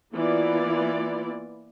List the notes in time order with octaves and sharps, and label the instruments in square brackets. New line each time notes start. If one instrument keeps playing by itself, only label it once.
[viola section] E3 A#3 B3 E4 F4 D5